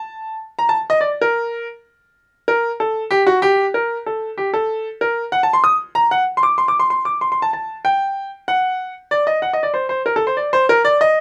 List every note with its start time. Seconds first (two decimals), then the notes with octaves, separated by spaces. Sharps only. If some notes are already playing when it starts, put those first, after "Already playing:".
Already playing: A5
0.59 A#5
0.69 A5
0.90 D#5
1.01 D5
1.21 A#4
2.48 A#4
2.80 A4
3.11 G4
3.27 F#4
3.42 G4
3.74 A#4
4.06 A4
4.38 G4
4.54 A4
5.01 A#4
5.32 F#5
5.43 A5
5.53 C6
5.64 D#6
5.95 A#5
6.11 F#5
6.37 C6
6.43 D6
6.58 C6
6.68 D6
6.80 C6
6.90 C6
7.05 D6
7.21 C6
7.32 C6
7.42 A5
7.53 A5
7.85 G5
8.48 F#5
9.11 D5
9.27 D#5
9.42 F#5
9.53 D#5
9.63 D5
9.74 C5
9.89 C5
10.06 A#4
10.16 A4
10.27 C5
10.37 D5
10.53 C5
10.69 A#4
10.85 D5
11.01 D#5